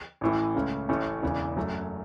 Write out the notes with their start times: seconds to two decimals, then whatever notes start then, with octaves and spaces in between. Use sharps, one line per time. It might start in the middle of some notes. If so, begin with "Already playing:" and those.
0.21 A1 A2 E3
0.55 C#2 C#3 A3 C#4
0.89 A1 A2 A3 C#4
1.22 E1 E2 C#3 E3
1.56 F#2 F#3 A3